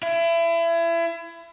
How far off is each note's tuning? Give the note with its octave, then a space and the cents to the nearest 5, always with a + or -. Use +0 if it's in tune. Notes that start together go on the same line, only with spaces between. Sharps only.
E4 +30